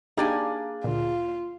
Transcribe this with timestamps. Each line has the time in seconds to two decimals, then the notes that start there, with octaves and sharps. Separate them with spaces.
0.17 A#3 D4 D#4 G4 G#4 F5 G5 G#5
0.84 D2 A#2 F4